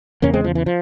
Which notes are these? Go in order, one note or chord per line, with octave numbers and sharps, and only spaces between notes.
E2 C#3 A#3 C#4
G#3 C4
F3
E3
F3